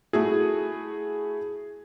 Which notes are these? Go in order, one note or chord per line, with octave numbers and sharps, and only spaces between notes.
A3 E4 F#4 G#4